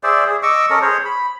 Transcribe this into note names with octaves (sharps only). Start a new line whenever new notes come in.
G#4 C5 D5 E5
G#4
D#5 C#6 D6 E6
C#4 A4 A#4 D#5
G#4 C5 C#5
B5